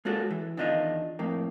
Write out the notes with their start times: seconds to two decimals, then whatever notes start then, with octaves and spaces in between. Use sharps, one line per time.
0.05 G#3 A#3 C#4 F#4 A4
0.30 E3
0.57 E2 D#3 D4 F4 D#5
1.19 F2 A2 A#3